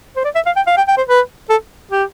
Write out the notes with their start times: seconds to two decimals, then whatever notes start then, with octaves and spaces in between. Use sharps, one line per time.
0.17 C5
0.25 D5
0.35 E5
0.46 F5
0.56 G5
0.67 F5
0.77 G5
0.88 G5
0.97 C5
1.08 B4
1.50 A4
1.91 G4